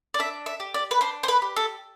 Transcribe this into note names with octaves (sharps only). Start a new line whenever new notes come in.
D5
D4 E5
E5
G4
D5
B4
D4 C5
C5
B4
G4
A4